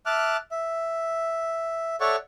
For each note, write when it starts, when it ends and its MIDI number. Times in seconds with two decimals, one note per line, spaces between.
0.06 0.37 76
0.06 0.37 81
0.06 0.37 86
0.06 0.37 89
0.06 0.37 90
0.51 1.96 76
2.01 2.16 69
2.01 2.16 73
2.01 2.16 74
2.01 2.16 76
2.01 2.16 78
2.01 2.16 85